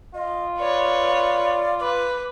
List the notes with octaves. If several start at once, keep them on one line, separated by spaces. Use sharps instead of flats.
F4 D#5
B4 C#5 D5
B4 D6